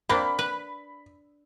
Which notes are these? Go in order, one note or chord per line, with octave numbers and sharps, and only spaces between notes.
A#3 C4 D4 B5
B4